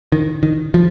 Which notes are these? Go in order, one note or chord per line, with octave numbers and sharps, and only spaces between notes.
D#3
D#3
F3